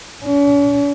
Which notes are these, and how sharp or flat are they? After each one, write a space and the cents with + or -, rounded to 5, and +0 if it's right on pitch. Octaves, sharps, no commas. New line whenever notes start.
C#4 +45